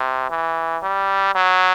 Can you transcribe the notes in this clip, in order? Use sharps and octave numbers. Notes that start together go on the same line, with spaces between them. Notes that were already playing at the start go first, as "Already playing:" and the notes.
Already playing: C3
E3
G3
F#3